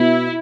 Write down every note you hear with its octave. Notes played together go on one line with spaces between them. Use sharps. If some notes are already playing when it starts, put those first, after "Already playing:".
Already playing: B2 B3 E4